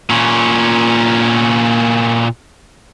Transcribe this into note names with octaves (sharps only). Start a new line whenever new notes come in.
A#2 C#4